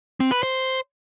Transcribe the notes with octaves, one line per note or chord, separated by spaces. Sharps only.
C4
B4
C5